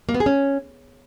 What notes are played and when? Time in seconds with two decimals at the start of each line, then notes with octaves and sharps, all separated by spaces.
0.09 A#3
0.14 B3
0.20 G#4
0.26 C#4